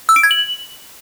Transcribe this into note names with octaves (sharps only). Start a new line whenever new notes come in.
E6
D7
G#6
F#7